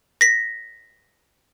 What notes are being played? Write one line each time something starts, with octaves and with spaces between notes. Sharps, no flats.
A#6 B6